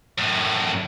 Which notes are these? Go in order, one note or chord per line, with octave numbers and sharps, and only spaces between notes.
F#2 A2